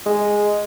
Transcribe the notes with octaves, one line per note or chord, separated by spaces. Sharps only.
G#3